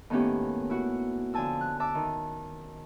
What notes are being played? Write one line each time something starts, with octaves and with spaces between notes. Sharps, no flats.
A2 D#3 A#3 B3 C#4 G4
E4 F#4 F#5
D3 F3 G#5 A5 E6
F#6
E5 A5 D6 E6
D#3